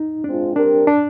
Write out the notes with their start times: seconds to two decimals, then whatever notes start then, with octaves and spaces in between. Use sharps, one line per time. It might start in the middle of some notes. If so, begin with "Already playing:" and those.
Already playing: D#4
0.24 G#3 C4 D4 F4
0.56 G3 C4 D4 G4 A#4
0.87 D4